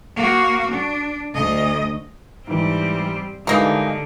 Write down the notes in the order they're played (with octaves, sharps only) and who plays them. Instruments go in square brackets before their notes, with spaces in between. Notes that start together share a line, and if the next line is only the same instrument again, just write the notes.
[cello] A#3 F#4
D4
D2 D#5
[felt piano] G#2 E3 [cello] G3 C4
[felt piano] G2 G#3 A#5 [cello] D3 [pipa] E3 A#3 D#4